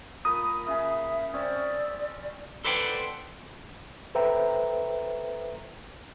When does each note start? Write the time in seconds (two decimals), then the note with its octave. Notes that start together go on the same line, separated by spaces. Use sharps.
0.25 A#2 A#5 B5 D#6
0.67 C#3 G#4 E5
1.34 C4 C#4 D5 E5
2.65 A4 B4 C5 D5 F#5 G5
4.15 A4 B4 C5 E5 G5 A#5